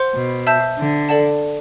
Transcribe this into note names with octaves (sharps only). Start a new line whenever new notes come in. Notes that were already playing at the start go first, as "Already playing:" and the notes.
Already playing: C5 F#5 C6 G6
B2
E5 A5 E6 G6
D3
A4 D5 F#5 A5